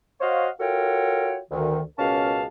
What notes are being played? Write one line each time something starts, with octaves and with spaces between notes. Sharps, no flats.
F#4 C5 C#5 D#5 F5
F4 F#4 A4 A#4 C#5 G5
D2 D#3
C#2 B2 C#4 A#4 F5 A5